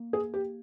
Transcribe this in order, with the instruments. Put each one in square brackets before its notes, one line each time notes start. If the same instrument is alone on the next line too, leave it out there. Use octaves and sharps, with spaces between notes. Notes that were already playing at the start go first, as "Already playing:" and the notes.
Already playing: [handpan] A#3
[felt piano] G#4
G4